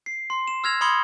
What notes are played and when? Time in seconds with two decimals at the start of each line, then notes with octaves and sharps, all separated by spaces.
0.06 C7
0.30 C6
0.48 E7
0.64 E6 F6 G#6 A#6 F7
0.81 B5 C6 D#6 G#6 C#7 G7